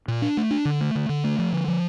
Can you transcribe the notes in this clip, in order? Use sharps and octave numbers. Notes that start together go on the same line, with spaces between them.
A#2
D4
A3
D4
D3
A3
D3
D3
A3
F3
D3
F3